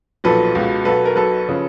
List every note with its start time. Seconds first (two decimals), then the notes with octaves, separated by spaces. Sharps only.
0.24 B1 A#2 F3 A4 B4
0.55 C#2 B2
0.85 B1 B2 A4 B4
1.06 A#4
1.16 B1 B2 A4 B4
1.49 C#3 F3